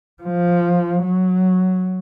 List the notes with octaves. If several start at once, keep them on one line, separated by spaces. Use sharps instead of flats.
F3
F#3